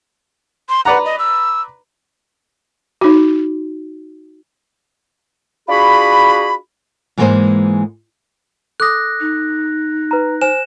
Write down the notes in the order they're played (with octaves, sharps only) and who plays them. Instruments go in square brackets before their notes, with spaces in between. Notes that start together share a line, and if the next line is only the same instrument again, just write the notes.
[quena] C6
[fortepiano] B4 D5 A#5 [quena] F#5
[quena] D#5
E6
[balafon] D#4 F#4
[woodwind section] D4 F4 F#4 G#4 B5
[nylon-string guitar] G#2 E3 G#3 A#3 C5 G#5
[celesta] A4 D6 D#6 [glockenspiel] F#6 A#6
[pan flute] D#4
[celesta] B4 A#5
[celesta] C5 G#5 [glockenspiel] E7